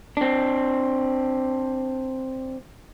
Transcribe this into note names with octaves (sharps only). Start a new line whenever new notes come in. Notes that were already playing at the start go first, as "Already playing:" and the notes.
C4 D4